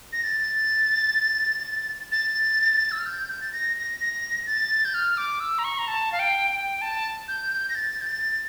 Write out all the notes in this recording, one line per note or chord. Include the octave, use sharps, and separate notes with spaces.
A#6
A6
A6
E6
F6
G6
G6
A6
A#6
A#6
A#6
A6
G6
F6
D6
E6
A#5
C#6
A#5
A5
F5
G5
G5
A5
G6
A#6
A6
G6
A6